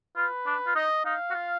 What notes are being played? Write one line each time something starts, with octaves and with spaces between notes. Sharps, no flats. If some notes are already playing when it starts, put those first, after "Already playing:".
F4 B4
D4
F4
D#4 D#5
D#4 F5
F#4
F4